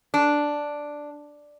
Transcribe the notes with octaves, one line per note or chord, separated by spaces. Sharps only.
D4